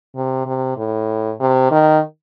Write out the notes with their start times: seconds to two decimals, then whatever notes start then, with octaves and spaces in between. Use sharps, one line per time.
0.16 C3
0.46 C3
0.77 A2
1.40 C3
1.71 D#3